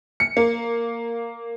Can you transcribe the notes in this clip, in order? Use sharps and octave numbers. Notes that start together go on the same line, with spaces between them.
C#7
A#3